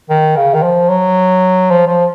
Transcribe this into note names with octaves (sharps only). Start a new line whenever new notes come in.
D#3
C#3
D#3
F3
F#3
F3
F3